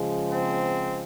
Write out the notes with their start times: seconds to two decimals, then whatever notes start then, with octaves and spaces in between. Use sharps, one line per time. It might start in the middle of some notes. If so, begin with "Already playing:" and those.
Already playing: C#3 F3 G#3
0.31 C4